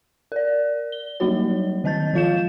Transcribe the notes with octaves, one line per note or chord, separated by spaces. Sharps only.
A#4 D5
G7
F#3 G3 A#3 D#4 F#4 C#5
D#3 C4 D#5 A5 G6 A6
F3 G#3 F4 F5 G6 E7